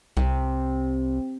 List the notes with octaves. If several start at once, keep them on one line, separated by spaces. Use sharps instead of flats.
C2 C3